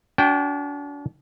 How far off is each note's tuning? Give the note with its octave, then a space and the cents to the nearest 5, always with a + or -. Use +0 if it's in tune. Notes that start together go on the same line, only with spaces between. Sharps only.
D4 -40 F#4 +0 G5 +0